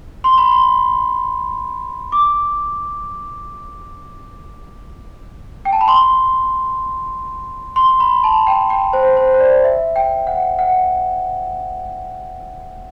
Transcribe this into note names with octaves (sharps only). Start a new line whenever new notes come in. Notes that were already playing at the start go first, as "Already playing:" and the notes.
C6
B5
C6
D6
G5
A5
B5
C6
C6
B5
A5
G5
G5
C5
C5
C5
D5
E5
G5
F#5
F#5